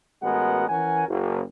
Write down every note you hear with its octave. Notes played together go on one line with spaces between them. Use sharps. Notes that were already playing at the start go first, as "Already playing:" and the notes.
A1 G#3 B3 F#4 A#4 F#5
E3 C#4 A#4 F#5 G#5
F#1